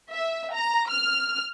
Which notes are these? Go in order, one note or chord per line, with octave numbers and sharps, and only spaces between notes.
E5
A#5
F6